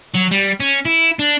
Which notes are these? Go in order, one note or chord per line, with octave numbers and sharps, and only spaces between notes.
F#3
G3
C#4
E4
D4